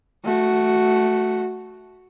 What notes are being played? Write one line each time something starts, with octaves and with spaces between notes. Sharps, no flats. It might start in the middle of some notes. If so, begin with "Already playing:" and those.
A3 F#4